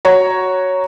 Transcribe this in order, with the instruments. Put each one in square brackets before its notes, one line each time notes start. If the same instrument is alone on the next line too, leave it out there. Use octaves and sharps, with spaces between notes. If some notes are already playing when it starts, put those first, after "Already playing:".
[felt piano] F#4 C#5 A#5